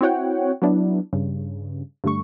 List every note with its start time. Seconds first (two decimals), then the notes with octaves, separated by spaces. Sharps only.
0.01 C4 E4 F#4 C#5 F#5 G5
0.62 F#3 B3 D4 E4
1.13 G2 C#3
2.04 G2 D3 A3 C#6